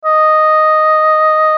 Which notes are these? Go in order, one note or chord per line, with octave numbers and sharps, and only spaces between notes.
D#5